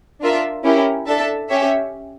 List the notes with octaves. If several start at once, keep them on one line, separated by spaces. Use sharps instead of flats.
D4 F4 A#4 E5
C#4 E4 G4 A#4
D4 A4 E5 A5
C#4 G4 C#5 E5